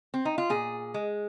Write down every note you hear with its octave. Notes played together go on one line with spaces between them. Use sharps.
C4
D#4
F4
A#2 G#4
G#3